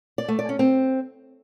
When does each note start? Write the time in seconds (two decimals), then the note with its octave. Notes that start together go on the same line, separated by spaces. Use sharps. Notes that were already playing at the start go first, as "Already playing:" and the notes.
0.18 D5
0.28 A3
0.39 D5
0.49 C#4
0.59 C4